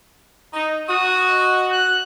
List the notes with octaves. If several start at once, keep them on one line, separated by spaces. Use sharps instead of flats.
D#4
F#4 D#6
D#5
F#6